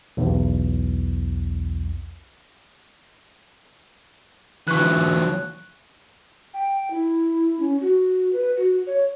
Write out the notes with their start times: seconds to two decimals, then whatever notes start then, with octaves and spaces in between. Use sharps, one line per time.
0.17 B1 E2
4.68 E3 F#3 C#6 F#6
6.54 G5
6.91 E4
7.59 C#4
7.81 F#4
8.33 B4
8.57 F#4
8.87 C#5